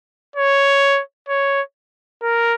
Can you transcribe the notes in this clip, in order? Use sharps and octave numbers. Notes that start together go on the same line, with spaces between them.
C#5
C#5
A#4